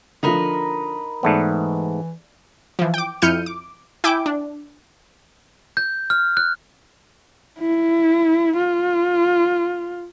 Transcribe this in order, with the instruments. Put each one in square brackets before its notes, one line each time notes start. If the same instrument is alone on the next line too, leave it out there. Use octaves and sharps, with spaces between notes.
[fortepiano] D3 F3 [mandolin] D#4 A#4 B4
[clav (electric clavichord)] G#2 A3 B3 [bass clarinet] E3 [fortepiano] D5 A5
[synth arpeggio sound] E3 F3
G5 D6
F2 E4 F6 G6 C#7 D#7
D6
E4 G5 G#5 D6
D4
[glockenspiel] G6
F6
F#6
[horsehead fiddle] E4
F4